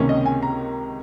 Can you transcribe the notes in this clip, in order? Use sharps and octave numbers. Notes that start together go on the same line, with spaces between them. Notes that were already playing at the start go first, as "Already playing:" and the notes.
Already playing: C#2 C3 D#3 A#3 C#4
D#5
G#5
A#5